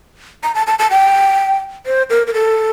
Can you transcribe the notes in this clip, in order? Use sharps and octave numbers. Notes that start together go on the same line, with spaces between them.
A#5
A5
A5
A5
G5
C5
A#4
A#4
A4